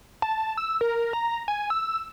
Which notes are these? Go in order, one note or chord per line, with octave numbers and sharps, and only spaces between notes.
A5
E6
A#4
A#5
G#5
E6